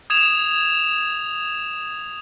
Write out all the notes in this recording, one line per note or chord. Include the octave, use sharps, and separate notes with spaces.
D#6 G#6 E7 F7